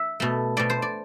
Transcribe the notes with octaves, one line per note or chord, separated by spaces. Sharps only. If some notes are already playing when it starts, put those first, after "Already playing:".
Already playing: E5
B2 A3
B2 A3 D5
C5
D5